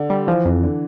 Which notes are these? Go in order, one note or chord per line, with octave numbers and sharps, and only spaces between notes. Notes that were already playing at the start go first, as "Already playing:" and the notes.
Already playing: D3
G3
E3 F3
F2
D3